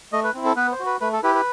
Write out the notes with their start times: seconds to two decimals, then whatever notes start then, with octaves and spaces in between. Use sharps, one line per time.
0.13 A3 D#5
0.24 B4
0.34 C4 E4
0.45 A4
0.56 B3 B4
0.72 C5
0.79 F#4
0.86 B4
1.01 A3 B4
1.13 A4
1.23 E4 G4 B4
1.35 B4